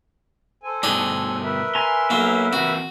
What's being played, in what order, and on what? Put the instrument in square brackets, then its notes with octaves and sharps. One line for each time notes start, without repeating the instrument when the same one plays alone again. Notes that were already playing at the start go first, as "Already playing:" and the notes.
[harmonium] A4 C5 G#5
[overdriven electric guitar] G2 B2 [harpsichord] D4 D#4 G#4
[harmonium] A#4 B4 E5
[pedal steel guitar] G#5 A#5 [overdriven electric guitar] C6
[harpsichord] B1 F#3 [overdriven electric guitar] A#3
[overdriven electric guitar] E3 C4 [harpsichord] F#4